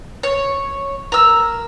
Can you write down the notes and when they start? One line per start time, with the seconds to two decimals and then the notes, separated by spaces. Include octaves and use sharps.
0.23 C#5
1.12 A#4 E6